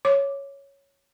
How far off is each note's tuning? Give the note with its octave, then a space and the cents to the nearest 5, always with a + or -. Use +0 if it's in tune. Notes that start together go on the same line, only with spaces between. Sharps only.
C#5 +0 D6 +0